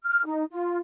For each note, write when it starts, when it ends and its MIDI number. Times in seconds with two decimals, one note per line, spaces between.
0.04 0.25 89
0.26 0.44 63
0.51 0.78 65